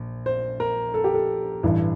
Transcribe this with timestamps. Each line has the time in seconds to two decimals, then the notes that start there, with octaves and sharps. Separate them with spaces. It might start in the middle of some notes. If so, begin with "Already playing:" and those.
Already playing: A#1
0.26 C5
0.60 A#4
0.94 A4
1.04 G4
1.14 A4
1.63 A1 G2 E3